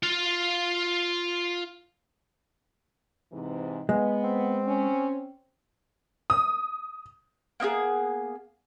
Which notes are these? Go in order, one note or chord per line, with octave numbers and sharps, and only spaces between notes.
F4 F5
G#2 C3 E3
G#3 B3
C4
C#4
D#6
A#3 B3 D#4 G#4